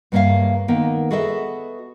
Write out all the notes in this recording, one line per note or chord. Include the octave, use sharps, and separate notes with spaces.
G2 C#3 A#3 C#5 E5 F5
D#3 A#3 B3
F#4 G#4 A4 B4 D#5 E5